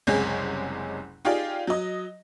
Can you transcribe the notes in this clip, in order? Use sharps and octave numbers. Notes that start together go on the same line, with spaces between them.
F#1 C2 C3 G#3 C#4 G#4
D#4 F4 G4 G#4 D5 F5
F#3 D#5